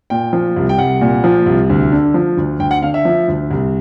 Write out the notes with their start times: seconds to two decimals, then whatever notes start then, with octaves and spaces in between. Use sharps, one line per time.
0.10 A#2 G5
0.33 F3
0.56 C2
0.69 G5
0.78 C2 F#5
1.01 A#2
1.24 F3
1.46 C2
1.70 D2
1.92 D3
2.14 F3
2.37 D2
2.59 D2 G5
2.71 F#5
2.82 D3 F5
2.94 E5
3.05 F3
3.28 D2
3.51 C2